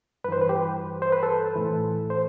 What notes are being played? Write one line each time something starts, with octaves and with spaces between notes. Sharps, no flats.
G2 E3 B4 C5
B4
G4
C5
B4
A4
A2 E3
C5